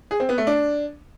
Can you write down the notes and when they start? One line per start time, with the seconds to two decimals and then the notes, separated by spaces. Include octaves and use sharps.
0.11 G#4
0.20 C4
0.29 B3
0.38 A3
0.47 D4